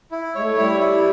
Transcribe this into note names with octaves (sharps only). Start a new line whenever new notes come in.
E4
G#3 C#5
A3
G3 E4
E4